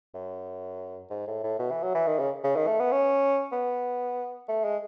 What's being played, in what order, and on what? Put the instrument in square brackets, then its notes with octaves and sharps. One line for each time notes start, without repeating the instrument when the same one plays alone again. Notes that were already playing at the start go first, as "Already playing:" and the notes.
[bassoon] F#2
G#2
A2
A2
B2
E3
F#3
E3
D#3
C#3
C#3
D#3
A3
B3
C#4
B3
A3
G#3